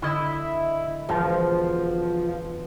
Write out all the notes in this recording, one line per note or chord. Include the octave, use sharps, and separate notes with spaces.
D3 E4 D#5 E6
E1 F3